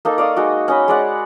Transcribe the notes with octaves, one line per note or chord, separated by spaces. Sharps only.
A#3 D#4 A4
D5 F5 C#6 D#6
G#3 D#4 F#4
C#4 D#5 B5
G#3 D5 F#5